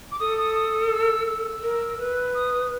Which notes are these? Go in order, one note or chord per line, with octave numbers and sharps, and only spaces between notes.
D6
A4 D#6
D#6
D#6
E6
E6
A#4
B4
D#6